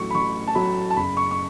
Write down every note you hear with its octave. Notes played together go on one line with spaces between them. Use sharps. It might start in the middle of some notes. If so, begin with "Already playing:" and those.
Already playing: A1 A2 F#3 A3 C#6
B5
A1 C#6
A5
A2 F#3 A3 B5
A5
F#1 B5
C#6
C#6